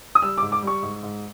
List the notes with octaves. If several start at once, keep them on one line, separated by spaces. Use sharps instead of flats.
D#6
G3 E6
D6
G#2
D6
G3 C#6
G#2
G#2